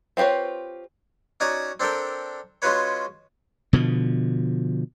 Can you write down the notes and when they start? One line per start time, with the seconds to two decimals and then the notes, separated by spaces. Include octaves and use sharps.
0.17 C4 F4 G4 B4 C#5
1.40 C#4 D#4 F#4 D5 G#5 A#5
1.80 C4 D4 A4 A#4 G5
2.62 G#3 C#4 F4 F#4 B4 C#5
3.73 B2 D3 F3